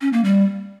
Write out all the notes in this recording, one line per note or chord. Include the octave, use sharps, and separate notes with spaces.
C#4
A#3
G3